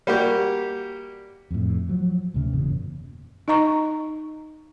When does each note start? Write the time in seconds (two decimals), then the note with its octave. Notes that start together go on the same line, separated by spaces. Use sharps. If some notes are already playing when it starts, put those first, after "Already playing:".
0.07 G3 A#3 F#4 G4
1.51 F2 A2
1.89 F3 F#3
2.34 D2 C3 C#4
2.53 F#1 E2 A#2 C#3
3.48 D#4 D#5 A#5 C#6